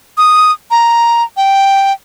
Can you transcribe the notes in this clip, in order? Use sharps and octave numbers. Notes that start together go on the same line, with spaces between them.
D#6
A#5
G5